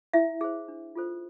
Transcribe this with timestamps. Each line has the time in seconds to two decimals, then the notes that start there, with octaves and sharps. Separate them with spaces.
0.13 E4 E5
0.41 G#4 C5
0.68 D4
0.95 F4 A4 C5